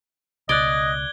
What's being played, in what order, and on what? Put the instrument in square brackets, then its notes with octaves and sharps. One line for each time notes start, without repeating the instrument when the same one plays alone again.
[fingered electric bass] C#2 B2 [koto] D5 [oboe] D#5 [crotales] F#6 G#6 G7